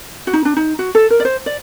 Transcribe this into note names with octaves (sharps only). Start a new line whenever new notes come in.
F#4
D#4
D4
D#4
F#4
A4
A#4
D5
C5
D5